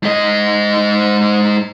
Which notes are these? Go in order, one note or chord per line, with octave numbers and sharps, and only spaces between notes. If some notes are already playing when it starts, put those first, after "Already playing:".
G#2 D#5